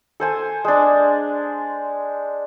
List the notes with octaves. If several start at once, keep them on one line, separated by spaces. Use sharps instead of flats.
A4 C5 G#5
G#3 D4